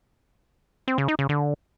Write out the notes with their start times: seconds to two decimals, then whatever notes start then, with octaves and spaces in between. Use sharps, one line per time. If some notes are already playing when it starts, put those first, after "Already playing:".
0.88 C4
0.98 C#3
1.08 D#4
1.19 C#3
1.29 D3